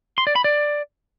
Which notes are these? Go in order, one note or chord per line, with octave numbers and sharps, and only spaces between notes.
C6
D5
B5
D5